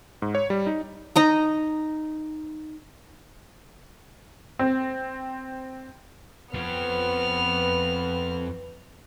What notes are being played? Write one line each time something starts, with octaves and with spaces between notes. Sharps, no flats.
G#2
C#5
G3
D#4
D#4 D#5 A#5
C4
F2 F3 B3 B4 F6